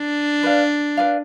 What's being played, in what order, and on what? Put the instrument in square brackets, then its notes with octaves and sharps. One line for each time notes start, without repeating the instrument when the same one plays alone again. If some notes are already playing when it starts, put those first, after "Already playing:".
Already playing: [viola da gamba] D4
[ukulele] B4 D5 F5
B4 D5 F5